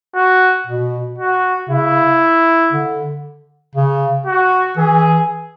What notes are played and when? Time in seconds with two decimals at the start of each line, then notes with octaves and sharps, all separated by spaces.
0.15 F#4
0.67 B2
1.18 F#4
1.69 C#3 E4
2.73 D3
3.75 C#3
4.26 F#4
4.77 E3 G#4